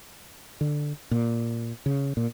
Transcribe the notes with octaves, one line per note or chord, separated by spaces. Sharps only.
D3
A#2
C#3
A#2